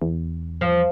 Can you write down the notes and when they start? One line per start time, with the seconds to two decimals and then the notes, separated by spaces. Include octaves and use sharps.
0.02 E2
0.61 F3